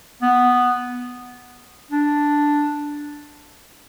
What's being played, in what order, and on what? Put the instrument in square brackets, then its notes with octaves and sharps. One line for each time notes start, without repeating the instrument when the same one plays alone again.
[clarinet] B3
D4